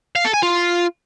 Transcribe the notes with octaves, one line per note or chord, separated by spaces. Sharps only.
F5
A4
G#5
F4